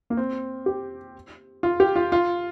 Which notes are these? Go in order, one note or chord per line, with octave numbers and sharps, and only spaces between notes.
A#3
C4
G4
F4
G4
F4
F4